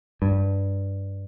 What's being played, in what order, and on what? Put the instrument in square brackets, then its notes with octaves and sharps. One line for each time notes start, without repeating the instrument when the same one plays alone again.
[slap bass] G2